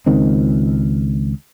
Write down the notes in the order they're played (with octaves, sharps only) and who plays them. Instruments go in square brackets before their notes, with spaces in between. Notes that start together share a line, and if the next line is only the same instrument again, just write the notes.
[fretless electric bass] C#2 D#3 C4